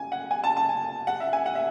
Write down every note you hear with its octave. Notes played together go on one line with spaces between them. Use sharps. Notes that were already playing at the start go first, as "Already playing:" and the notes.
Already playing: G#5
F#5
G#5
A5
A5
G#5
F#5
E5
G#5
F#5
E5